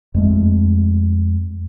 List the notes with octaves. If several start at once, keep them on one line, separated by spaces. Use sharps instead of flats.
F2 G#3 A3